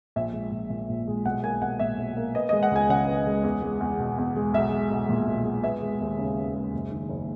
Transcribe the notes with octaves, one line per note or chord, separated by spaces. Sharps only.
A#1 E5
G#3
A#1
A#2
A#1
G#3
B1 F#5
A#3 G#5
B1 F#5
A#2 E5
B1
A#3
B3 D#5
G#3 D#5
F#5
C#2 G#5
C#3 F#5
B3
G#3
E2
G#3
E2
B2
E2
G#3
B1 E5
G#3
B1
A#2
B1
G#3
B3 E5
G#3
D#2
C#3
B3
G#3
F#1
D#3
F#1